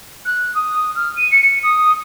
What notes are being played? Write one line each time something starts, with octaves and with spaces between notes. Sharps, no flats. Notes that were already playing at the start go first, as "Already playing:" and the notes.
F#6
D#6
F6
D#7
C#7
D#6